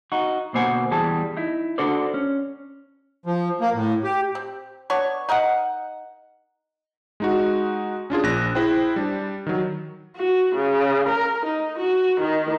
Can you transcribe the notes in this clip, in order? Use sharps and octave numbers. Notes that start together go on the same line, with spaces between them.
D#4 F#4
B2 D3 A#3 C5 F#5 G#5
E2 E3 G3 G#4 A5
D#4 E4
D4 F#4 A4 C5 D5
C#4
F3
A#3
A2
G4
C4
B3 D4 C#5
D#4 A#4 D#5 F#5
G#3 D#4 F#4
C#4 D4 F4 G#4
A#1 F#6 A#6
E4 G#4 C5 G5
G3 D4
D#3 F#3
F#4
C#3
A#4
D#4
F#4
D#3